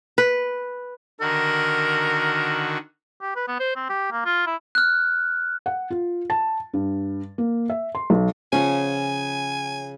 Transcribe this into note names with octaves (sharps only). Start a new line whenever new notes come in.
B4
D3 D#3 F#4 A#4
G4
B4
B3
C5
C4
G4
A#3
F4
E4
F6 F#6
F#5
F4
A5
G2
A#3
E5
C6
B1
C#3 F3 C#4 F#5 G#5